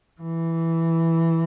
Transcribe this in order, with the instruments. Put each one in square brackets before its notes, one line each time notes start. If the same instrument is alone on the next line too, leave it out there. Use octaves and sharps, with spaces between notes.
[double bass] E3